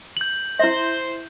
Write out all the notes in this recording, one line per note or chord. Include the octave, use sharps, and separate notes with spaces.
G6 F#7
E4 C5 E5